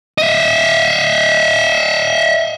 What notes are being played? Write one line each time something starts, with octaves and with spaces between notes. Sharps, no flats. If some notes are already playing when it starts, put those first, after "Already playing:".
D#5 E5